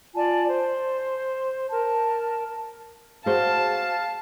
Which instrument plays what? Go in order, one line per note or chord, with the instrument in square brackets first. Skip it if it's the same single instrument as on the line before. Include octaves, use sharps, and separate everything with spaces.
[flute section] F4 D5 G#5 A5
C5
A#4 A5
[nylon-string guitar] F#4 G#4 C5 [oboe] F5 [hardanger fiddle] A5